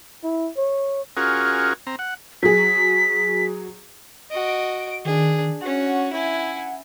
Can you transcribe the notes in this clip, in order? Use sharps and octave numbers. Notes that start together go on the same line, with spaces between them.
E4
C#5
C#4 F4 F#4 G#4 A#4
C4 A#5
F#5
F#3 G#4 B6
F#4 D#5 D7
D#3 D4 G#4
C#4 F#4 F#5
E4 G#5